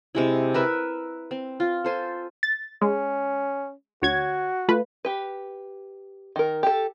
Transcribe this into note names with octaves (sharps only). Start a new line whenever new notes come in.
C3 G#3 E4
A#4 B4 E5
C4
F4
A4 C5 G#5
A6
G#3 C#4
D2 F#4 C#5 G#6
A3 F4 B4
G4 B4
D#3 A#4
G4 A4